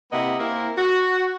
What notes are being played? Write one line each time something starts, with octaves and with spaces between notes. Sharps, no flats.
C3 A#3 B3 E4 D#5 F#5
A#3 C4 E4
F#4